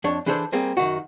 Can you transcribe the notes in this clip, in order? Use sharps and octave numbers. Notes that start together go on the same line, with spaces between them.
F2 D4 C#5
E3 D4 G#4 A4 C5
G3 A#3 C4 G#4
F#2 D#3 F#4